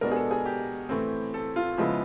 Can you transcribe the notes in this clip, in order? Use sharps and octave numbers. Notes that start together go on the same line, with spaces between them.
B2 G#3 B3 D4 A#4
G#4
A4
G#4
G4
A2 E3 A3 C4
A4
F4
C#3 F3 G#3 B3 E4